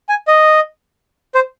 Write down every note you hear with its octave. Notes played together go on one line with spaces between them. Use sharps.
G#5
D#5
C5